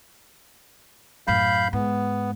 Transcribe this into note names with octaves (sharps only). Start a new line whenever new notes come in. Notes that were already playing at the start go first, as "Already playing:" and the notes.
F#2 A2 F5 B5 G6
G#2 B3